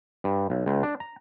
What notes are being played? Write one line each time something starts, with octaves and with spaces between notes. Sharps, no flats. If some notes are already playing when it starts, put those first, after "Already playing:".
G2
B1
C#2
D4
A#5